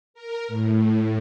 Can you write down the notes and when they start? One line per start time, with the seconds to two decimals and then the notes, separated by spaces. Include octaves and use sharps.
0.14 A#4
0.48 A2